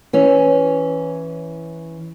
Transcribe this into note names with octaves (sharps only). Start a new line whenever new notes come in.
E3 C#4